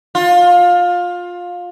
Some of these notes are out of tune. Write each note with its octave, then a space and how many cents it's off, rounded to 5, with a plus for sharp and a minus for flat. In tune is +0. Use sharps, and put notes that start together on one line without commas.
F4 +20